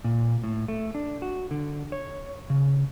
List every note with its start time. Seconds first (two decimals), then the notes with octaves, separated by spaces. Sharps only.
0.04 A#2
0.43 A2
0.68 A3
0.95 D4
1.22 F#4
1.51 D3
1.92 C#5
2.50 C#3